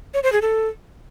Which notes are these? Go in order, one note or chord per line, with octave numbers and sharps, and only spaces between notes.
C#5
C5
G#4
A4